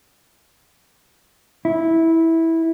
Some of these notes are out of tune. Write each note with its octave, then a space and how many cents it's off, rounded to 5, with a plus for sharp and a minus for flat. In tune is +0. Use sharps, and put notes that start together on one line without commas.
E4 -10